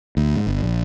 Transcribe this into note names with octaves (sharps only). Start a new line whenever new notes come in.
D2
G#2
G1
A#1